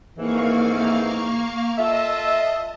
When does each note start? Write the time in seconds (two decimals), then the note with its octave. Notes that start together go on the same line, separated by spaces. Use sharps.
0.17 F2 G#2 E3 A#3 F5 C#6
1.78 F4 A4 D#5 E5 A5